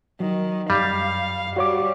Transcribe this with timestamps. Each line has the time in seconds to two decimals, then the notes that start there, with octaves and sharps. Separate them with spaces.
0.20 D#3 F#3
0.70 F#2 G3 F5
1.56 G3 F#4 C#5 D6